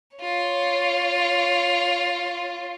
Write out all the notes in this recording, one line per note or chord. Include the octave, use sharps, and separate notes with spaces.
F4 C#5